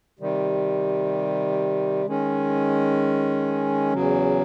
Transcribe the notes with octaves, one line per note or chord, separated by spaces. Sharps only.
C3 D#3 G3
D#3 G#3 C#4
E2 C#3 F#3